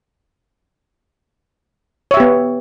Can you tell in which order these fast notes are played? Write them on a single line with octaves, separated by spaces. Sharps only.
C#5 E5 G4 B3